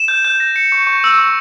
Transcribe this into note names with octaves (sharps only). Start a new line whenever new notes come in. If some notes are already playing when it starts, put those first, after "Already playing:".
Already playing: E7
G6
G6
A#6
C#7
C#6
C#6
E6
C#6